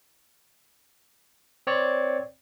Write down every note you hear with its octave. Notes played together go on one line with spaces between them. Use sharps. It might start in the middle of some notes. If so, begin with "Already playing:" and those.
C4 C#5 D5